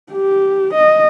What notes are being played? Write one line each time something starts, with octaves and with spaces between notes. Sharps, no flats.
G4
D#5